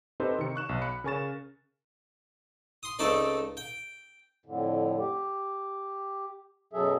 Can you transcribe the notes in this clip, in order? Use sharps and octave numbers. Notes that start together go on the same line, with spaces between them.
C4 D#4 G4 A4 B4 C5
C3 D#3 C#7
C#6 F#6 E7
B1
B5 F#6 C#7
C#3 A#4 G#5 C#6 A6 E7
C6 D#6
C#2 A3 C4 D#4 A4 D5
G5
F2 A2 D3
G4
F#2 B2 F#3 G#4 A4 E5